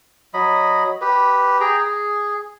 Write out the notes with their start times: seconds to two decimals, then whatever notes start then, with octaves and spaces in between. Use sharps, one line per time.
0.34 F#3 D#5 B5
1.01 G4 B4
1.60 G#4 G5 A#5
1.78 G#4